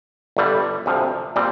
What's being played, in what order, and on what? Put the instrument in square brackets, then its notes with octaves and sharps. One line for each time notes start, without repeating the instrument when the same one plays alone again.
[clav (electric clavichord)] G1 G2 D3 G3
D2 C3 F3
A#2 G3 C4